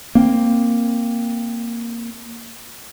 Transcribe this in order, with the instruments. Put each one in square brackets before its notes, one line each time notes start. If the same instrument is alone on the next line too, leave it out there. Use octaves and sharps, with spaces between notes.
[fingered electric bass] A#3 C4